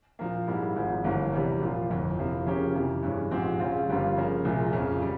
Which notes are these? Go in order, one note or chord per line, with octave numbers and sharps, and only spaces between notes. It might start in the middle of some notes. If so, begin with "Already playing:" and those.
A#2 F3 A#3
G#2 G3 A#3 E4
G#1 G#2 F3
G1 G2 E3 A#3
E2 C3 E3 G3
A#2 F3 A#3 F4
G1 F2 E3
F2 C3 F3 A#3 E4
C#3 F3 A#3 C#4 G4
F2 C3 E3
G2 E3 G#3 C#4
A#1 G#2 F3 C4 G4
C#3 F3 C4 F4
G1 G2 G3 A#3 F4
C#3 F3 A#3
C2 A#2 F3 G#3
F2 C#3 F3
G3